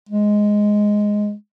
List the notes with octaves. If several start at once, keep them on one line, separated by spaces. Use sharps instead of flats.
G#3